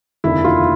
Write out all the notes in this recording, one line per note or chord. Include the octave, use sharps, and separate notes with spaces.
F1 D#2 D3 E4
F4